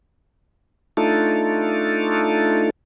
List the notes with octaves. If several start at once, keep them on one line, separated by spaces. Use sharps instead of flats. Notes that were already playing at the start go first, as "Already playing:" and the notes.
A3 D4 D#4 F4 A4